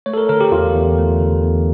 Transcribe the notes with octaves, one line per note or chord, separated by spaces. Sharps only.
A3 C#5
A4
A#4
D3 A#4
G4
E2 F4
E2
A3
D3
E2